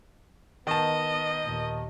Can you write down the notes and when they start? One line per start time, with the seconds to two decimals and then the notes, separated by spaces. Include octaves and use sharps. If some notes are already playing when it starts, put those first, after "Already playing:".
0.67 D#3 B3 D#5 A5
1.44 D#2 A#2